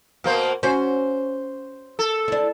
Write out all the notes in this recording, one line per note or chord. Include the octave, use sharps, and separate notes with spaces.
B2 A#3 C5
C#4 F#4 C5
A4
D4 E4